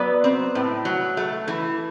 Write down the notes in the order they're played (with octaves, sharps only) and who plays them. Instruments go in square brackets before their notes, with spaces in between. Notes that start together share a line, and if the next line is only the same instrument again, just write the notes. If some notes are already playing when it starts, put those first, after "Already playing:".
Already playing: [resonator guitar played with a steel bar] F#3 B3 B4 D5
C4
A2
F#3
A3
E3